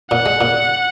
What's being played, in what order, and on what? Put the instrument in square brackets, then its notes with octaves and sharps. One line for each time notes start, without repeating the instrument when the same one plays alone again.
[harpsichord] A#2 [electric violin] F#5
[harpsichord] G#3
A#2